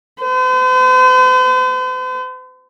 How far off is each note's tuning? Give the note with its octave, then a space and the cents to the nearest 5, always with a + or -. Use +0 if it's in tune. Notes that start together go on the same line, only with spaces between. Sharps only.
C5 -45